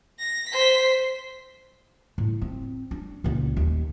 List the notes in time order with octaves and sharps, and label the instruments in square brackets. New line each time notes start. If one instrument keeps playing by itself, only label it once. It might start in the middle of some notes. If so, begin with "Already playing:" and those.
[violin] A#6
C5 B6
[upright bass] A2
C4
D4
C#2 A#2
D#2